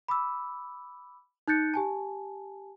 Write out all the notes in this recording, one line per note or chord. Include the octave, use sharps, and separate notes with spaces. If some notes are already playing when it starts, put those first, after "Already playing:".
B5 D6 E6
D#4 F#6 G6 A6 C#7
G4 G#5 A5